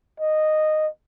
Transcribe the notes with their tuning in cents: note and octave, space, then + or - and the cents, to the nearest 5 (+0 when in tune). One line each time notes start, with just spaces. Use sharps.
D#5 -10